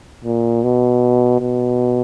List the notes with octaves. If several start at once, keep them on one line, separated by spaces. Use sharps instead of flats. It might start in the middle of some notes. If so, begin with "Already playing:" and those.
A#2
B2
B2